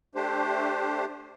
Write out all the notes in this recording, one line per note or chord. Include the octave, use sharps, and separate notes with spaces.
A3 D4 G4 C5